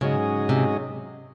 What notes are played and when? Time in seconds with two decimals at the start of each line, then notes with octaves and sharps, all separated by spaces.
0.01 G#2 C#3 F#3 C#4 G#4 D#5
0.49 C3